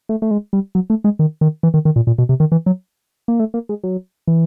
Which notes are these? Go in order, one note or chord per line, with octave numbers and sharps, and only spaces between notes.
A3
A3
G#3
G3
F#3
A3
G#3
D#3
D#3
E3
D#3
D#3
A#2
A#2
B2
C3
D#3
E3
F#3
A#3
A3
A#3
G#3
F#3
E3